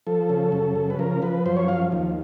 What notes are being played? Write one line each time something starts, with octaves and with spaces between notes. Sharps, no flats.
F3 A4
C#3
F#2
C#3
B4
F3 A#4
F3 B4
F#2 C5
C#5
F3 F5
D#2